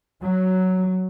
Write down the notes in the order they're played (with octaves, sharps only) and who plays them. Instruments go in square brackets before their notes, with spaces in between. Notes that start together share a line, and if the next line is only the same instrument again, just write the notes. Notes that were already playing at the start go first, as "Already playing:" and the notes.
[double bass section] F#3